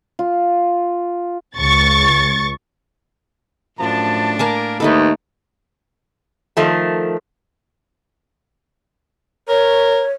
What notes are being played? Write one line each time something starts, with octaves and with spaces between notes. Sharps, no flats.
F4
C#2 C#6 A6
F#2 A2 F3 D4 A5
A#3 A#4 G#5 A5 D6
D#2 A3 B3 D#4 A4
D#3 F3 A3
A#4 C#5